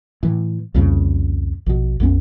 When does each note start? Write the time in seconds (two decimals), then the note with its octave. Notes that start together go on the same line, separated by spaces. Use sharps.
0.23 A2 E3
0.74 C2 F2 A#2 C#3
1.66 A#1 B2
2.00 A#1 F2 B3 C#4